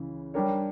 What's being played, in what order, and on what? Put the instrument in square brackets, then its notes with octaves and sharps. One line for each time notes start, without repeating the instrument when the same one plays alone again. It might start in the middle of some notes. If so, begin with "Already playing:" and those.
Already playing: [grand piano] C#2 C#3 E3
G3 D4 G4 A#4 C#5